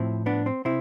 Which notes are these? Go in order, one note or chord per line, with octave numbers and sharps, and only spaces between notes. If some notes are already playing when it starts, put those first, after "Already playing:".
Already playing: A2 F3 C4 E4
B3 D4
C4
C3 C4 E4